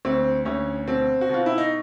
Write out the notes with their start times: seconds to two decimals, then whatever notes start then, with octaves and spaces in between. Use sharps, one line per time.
0.05 D2 C4
0.45 D2 C#4
0.87 B2 C4
1.21 F#4
1.29 B2 F4
1.46 E4
1.58 D#4